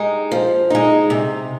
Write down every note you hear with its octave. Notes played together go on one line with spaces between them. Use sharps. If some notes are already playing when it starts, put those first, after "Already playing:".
Already playing: G#3 D#4 G4
F3
G#3 D#4
C3